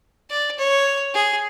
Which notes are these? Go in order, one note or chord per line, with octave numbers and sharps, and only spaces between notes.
D5
C#5
G#4